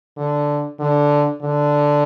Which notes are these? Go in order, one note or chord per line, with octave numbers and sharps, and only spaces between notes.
D3
D3
D3